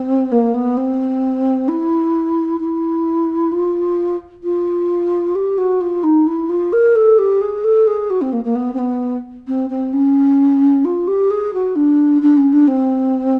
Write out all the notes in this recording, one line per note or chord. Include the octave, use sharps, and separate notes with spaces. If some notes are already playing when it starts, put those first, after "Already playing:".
Already playing: C4
A#3
B3
C4
E4
E4
F4
F4
G4
F#4
F4
D#4
E4
F4
A#4
A4
G4
G#4
A4
G#4
F#4
C4
A#3
A#3
B3
C4
B3
C4
C4
C#4
F4
G4
G#4
F#4
D4
D4
C#4
D4
C4